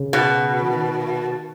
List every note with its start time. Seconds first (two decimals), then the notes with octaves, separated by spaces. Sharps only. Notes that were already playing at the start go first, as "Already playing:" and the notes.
Already playing: C#3
0.13 B2
0.62 E3
0.70 D#3